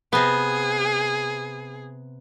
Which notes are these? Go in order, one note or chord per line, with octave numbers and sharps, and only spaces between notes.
C3 B3 G#4